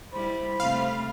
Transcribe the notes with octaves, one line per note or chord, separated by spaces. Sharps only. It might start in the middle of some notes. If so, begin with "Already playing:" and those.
G3 E4 C5 B5
C3 A3 C4 F5